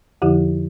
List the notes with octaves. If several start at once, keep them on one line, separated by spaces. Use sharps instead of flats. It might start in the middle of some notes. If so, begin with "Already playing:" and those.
F2 D3 F3 E4 G4